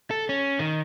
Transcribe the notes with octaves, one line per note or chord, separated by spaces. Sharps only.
A4
C#4
D#3